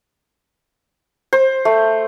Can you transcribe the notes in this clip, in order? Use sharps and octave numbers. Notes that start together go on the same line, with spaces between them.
C5
A3